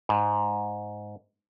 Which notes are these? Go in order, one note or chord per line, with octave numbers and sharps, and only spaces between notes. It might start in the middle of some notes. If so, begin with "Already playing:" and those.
G#2